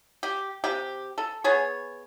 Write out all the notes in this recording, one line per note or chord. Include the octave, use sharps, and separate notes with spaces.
G4
C3 G4
A4
B3 G#4 C#5